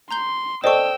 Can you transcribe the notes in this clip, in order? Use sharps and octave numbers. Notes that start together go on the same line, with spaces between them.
A#5 C6 G6 G7
A4 C5 D5 D#5 G5 C#6 E6